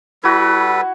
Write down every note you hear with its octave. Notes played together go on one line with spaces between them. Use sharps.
G3 E4 F#4 A4 B4